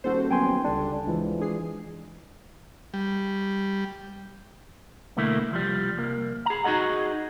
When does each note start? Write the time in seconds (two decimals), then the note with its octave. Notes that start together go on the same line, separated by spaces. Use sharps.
0.04 D#1 F#4 A4 C5
0.31 F#3 B3 G5 G#5 C6
0.65 C#2 D3 G3 D4
1.07 E3 F3 G#3
1.40 D4 G#4 C7
2.94 G3
5.17 B1 D3 A3 A#3 E4
5.51 C2 F3 G3
5.97 C2 A#3
6.46 G#4 A#5
6.64 D#4 F#4 G#4 D#5 F#5